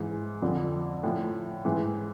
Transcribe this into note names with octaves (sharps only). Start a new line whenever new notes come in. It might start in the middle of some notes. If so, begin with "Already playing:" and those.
Already playing: G#2 E3
F2 D3 F3
A2 F3
G#2 E3